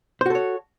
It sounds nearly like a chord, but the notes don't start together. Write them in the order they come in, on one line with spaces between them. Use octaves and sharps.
C5 F#4 A4 C#5